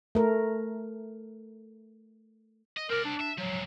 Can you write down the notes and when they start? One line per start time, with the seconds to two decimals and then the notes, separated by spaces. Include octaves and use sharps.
0.15 A3 A#4
2.77 D#5
2.90 C4 A#4 D5
3.05 D4
3.21 E5
3.38 F3 F#3 G#3